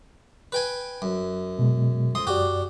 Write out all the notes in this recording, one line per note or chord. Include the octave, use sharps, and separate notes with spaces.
B4 G5 G#5
F#2
B2 G#3
F2 C6 D#6
F#2 F#4 G4 D5